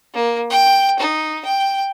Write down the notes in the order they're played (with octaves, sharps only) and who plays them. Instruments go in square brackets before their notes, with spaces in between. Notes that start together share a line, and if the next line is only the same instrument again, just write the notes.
[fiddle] A#3
G5
D#4
G5